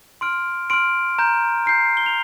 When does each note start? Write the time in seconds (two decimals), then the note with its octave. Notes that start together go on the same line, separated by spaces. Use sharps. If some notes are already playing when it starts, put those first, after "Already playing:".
0.21 C6 F6 D7
0.70 C6 F6 D7
1.19 A#5 G6
1.66 A#5 G6 C7
1.97 G7
2.06 F7